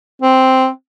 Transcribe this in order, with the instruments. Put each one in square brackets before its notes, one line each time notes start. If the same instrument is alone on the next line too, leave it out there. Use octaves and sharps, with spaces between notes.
[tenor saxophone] C4